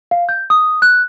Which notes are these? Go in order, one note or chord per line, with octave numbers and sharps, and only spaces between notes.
F5
G6
D#6
F#6